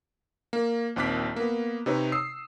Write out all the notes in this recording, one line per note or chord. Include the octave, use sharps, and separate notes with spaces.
A#3
A#1 D#2 C4 D6 F#6 B6
A#3 B3
C3 D#4 B4 C#5
D#6 E6 C7